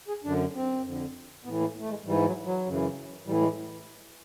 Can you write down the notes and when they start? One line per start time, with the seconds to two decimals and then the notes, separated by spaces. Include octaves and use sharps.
0.08 G#4
0.24 F#2 D3 D4
0.55 C4
0.84 F2 D3
1.44 A2 E3 B3
1.60 A#3
1.79 A3
1.89 G#3
2.05 G#2 E3 G3
2.26 F#3
2.45 F#3
2.66 F#2 C#3 E3
3.26 A2 E3 G3
3.41 G#3